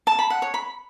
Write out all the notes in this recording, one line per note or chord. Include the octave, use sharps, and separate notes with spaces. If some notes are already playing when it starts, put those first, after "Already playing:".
A5
B5
F#5
C#5
B5